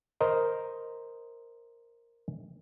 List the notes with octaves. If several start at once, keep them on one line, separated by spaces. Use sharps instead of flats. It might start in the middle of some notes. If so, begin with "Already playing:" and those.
A#4 C5 D#5